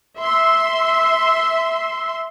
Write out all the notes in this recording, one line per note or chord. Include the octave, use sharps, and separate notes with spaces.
E5 C6